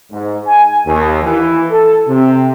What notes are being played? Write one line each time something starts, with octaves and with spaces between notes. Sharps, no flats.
G#2
G#5
D#2
E3
A4
C3